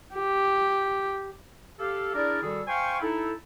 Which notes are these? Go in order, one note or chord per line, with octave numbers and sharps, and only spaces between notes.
G4
G4 A4 F5
D4 E4 G#4 A#4 D5
D#3 G3 F#4 G#4 A4
C5 F5 G5 G#5 C6 C#6
D#4 E4 A4